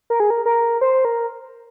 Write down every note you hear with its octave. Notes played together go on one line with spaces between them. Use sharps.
A#4
G#4
A#4
A#4
C5
A#4